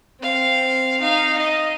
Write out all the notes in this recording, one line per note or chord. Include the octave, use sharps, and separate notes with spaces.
C4 F5
D#4 F5
D#5